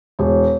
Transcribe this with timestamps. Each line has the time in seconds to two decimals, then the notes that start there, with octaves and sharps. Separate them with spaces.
0.19 E1